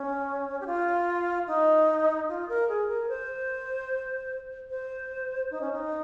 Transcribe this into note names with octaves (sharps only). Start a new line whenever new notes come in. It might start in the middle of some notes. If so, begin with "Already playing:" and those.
Already playing: C#4
G4
F4
D#4
F4
A#4
G#4
A#4
C5
C5
D#4
C#4
D#4